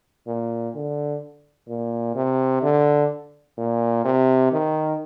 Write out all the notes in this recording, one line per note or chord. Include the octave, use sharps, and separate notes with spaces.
A#2
D3
A#2
C3
D3
A#2
C3
D#3